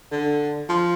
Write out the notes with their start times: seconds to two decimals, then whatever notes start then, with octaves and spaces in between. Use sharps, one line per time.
0.12 D3
0.69 F3